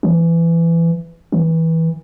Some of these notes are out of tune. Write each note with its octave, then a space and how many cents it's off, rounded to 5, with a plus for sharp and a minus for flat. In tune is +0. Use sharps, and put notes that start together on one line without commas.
E3 +20
E3 -20